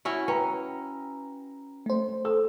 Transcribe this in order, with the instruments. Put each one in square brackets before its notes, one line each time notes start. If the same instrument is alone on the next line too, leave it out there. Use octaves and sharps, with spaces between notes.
[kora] C#4 E4 F#4
[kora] C#4 [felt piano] B4 G5 A#5
[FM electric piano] A3 C5
[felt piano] A4 E6